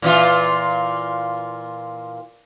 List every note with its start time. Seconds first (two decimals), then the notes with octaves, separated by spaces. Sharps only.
0.02 A#2 E3 F4